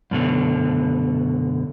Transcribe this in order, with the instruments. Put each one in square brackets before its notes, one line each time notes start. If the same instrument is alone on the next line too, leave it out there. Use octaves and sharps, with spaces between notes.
[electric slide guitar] F#2 B2 D3